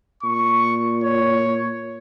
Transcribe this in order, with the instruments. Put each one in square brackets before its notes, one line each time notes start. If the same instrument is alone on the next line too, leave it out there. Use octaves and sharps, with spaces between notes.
[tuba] A#2 [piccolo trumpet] C#6
[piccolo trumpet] C#5